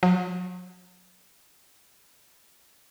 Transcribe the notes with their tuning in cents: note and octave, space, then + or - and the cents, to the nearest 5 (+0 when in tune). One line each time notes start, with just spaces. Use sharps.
F#3 -40